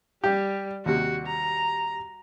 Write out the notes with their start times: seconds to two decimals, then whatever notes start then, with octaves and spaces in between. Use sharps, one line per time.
0.24 G3 G4
0.86 D#2 C3 F#4
1.27 A#5